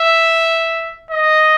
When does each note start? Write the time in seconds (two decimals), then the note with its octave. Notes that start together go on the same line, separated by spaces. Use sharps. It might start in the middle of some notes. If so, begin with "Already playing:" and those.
Already playing: E5
1.11 D#5